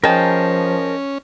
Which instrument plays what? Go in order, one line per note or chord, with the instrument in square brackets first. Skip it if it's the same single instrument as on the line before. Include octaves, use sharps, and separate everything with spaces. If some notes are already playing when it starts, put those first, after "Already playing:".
[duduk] F3 [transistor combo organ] C#4 [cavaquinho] D#4 G#4 G5 [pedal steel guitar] A#4 A5